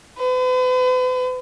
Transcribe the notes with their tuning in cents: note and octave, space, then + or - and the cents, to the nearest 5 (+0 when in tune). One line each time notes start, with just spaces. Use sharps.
B4 +45